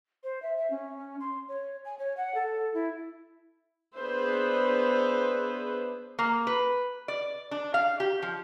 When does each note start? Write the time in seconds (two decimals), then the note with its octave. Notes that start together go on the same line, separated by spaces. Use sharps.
0.23 C5
0.42 E5
0.57 E5
0.70 C#4
1.20 C6
1.48 C#5
1.85 G#5
1.99 C#5
2.17 F#5
2.34 A4
2.74 E4
3.95 B3 D4 G#4 B4 C5 E5
6.19 A#3
6.47 B4
7.08 D5
7.51 D4
7.74 F5
8.00 G4
8.22 F3